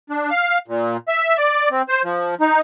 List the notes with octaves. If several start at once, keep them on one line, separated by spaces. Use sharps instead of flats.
D4
F5
A#2
E5
D5
C4
C5
F3
D#4